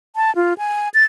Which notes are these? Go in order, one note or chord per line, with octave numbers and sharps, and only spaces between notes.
A5
F4
G#5
A6